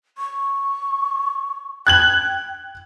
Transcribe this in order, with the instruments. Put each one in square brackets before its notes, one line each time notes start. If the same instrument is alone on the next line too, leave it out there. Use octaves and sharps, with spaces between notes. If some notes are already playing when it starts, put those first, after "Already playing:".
[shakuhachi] C#6
[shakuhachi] G5 [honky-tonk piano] F#6 G#6 F#7